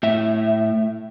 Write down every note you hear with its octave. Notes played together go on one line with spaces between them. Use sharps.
A2 E5